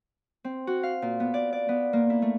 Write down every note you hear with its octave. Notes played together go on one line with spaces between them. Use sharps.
C4
F#4
F5
A#2
B3
D5
D5
B3
A#3
E4
A3